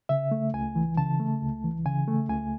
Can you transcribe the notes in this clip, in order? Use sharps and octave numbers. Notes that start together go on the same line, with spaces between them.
C#3 E5
A3
C#2 G#5
E3
C#3 A5
A3
C#2
E3
C#3 G#5
A3
C#2 G#5